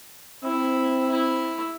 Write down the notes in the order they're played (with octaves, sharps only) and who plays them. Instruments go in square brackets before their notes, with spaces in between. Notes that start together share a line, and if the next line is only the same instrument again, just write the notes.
[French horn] C4 [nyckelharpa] E4
[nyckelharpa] E4